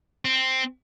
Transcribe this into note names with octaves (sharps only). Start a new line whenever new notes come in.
C4